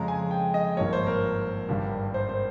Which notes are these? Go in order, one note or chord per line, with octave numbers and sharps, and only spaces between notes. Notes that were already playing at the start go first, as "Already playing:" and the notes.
Already playing: F2 C#3 G#3 A#5
G#5
G5
D#5
G#1 G2 F3 A#3 C#5
C5
A#4
G#1 G2 G3
C5
C5